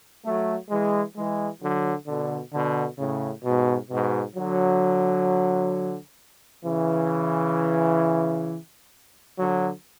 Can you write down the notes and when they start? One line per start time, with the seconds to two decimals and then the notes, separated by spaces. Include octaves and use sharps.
0.24 F#3 A3
0.70 E3 G#3
1.16 E3 G#3
1.61 D3 F#3
2.07 B2 D3
2.53 B2 D3
2.98 A2 C#3
3.44 G#2 B2
3.90 G#2 B2
4.35 D3 F#3
6.64 C#3 E3
9.38 D3 F#3